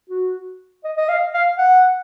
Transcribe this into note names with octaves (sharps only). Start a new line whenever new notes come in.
F#4
D#5
D#5
F5
F5
F#5